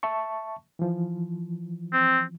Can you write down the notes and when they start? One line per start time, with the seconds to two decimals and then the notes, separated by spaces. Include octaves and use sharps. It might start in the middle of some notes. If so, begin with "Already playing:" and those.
0.03 E5 A5 C#6
0.79 E3 F3
1.93 C4